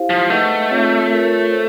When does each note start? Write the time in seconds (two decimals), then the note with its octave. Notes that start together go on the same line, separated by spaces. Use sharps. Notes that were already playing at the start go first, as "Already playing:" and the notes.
Already playing: E4 G4 C5 F5
0.10 F3
0.30 A3 D#4 G#4 B4 D#5 F#5
0.70 C4 F4 G#4 C#5
1.10 F4 A#4 C#5
1.50 A4 C5